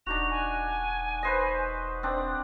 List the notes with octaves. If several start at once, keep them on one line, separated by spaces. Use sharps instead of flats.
E1 D4 D#4 F#4 F7
G#5
B4 C5 D#5
C4 D4 D#6